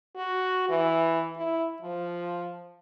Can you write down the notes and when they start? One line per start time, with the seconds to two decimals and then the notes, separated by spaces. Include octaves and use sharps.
0.16 F#4
0.69 E3
1.37 E4
1.82 F3